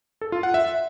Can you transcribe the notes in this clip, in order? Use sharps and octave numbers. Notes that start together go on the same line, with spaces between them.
A4
F4
F#5
E5